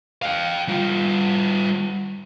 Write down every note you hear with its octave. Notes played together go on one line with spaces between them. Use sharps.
F5 G5
G3 F4